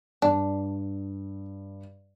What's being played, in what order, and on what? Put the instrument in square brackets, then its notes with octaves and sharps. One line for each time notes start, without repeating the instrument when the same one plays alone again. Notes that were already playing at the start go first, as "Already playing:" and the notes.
[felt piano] G2 [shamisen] D4